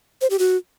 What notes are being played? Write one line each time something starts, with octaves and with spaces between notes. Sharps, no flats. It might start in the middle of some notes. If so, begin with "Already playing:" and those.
C5
G4
F#4